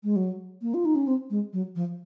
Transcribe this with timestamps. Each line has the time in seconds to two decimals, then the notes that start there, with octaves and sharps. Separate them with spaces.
0.04 G#3
0.16 F#3
0.62 A#3
0.74 F4
0.85 D#4
0.95 C#4
1.07 C4
1.30 G#3
1.53 F#3
1.76 F3